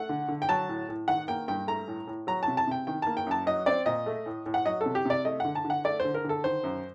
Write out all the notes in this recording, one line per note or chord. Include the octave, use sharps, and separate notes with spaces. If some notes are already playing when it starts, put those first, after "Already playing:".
Already playing: A3 F#5
D3
D3
G5
F#3 A5
A2
A2
D#3 F#5
A#3 G5
G2 G5
A3 A#5
A2
A2
F#3 A#5
A5
C3
A5
C3 G5
D#3 G5
A#3 A5
G5
F#2 A5
F#3 D#5
C4 D5
A#2 D#5
A3
A2
A2
F#5
F#3 D#5
A4
C3
G4
C3 D5
A3 D#5
D3 F#5
A5
D3
F#5
A3 D5
C5
D3
A#4
D3 A4
D#3 C5
F#2